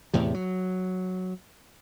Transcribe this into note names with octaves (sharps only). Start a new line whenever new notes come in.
E2 A2 C3
F#3